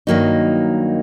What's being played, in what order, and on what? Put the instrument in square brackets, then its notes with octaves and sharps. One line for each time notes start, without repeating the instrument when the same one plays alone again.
[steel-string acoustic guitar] G2 D#3 F#3 A#3 D#4